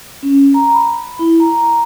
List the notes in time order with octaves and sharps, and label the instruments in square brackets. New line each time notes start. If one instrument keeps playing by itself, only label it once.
[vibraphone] C#4
A#5
B5
E4
A#5